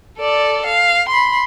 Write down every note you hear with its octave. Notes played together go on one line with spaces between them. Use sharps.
A4 D5
F5
B5 C6